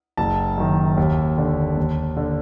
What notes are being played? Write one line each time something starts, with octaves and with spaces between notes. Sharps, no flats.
F#1 A5
F#2 D#3
D#2
D3
D#2
D3